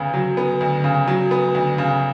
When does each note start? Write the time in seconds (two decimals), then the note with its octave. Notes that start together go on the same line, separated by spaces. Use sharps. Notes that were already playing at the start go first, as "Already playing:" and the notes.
Already playing: D2 C#3 B3
0.14 F#3
0.37 B3
0.61 D2
0.84 C#3
1.08 F#3
1.31 B3
1.55 D2
1.78 C#3